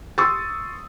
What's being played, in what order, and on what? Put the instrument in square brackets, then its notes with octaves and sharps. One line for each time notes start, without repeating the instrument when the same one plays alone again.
[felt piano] C6 C#6 D#6 E6 A6